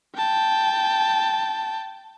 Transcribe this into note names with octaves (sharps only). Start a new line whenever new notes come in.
G5 A5